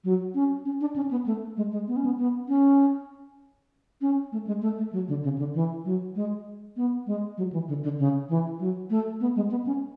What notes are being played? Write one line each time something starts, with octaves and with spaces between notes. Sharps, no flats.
F#3
C#4
C#4
D4
C#4
B3
A3
G#3
G#3
B3
C#4
B3
B3
C#4
C#4
A3
G#3
A3
A3
F#3
D3
C#3
D3
E3
F#3
G#3
B3
G#3
F#3
E3
D3
D3
C#3
E3
F#3
A3
B3
G#3
B3
C#4